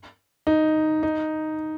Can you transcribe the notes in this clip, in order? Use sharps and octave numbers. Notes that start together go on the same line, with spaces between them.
D#4
D#4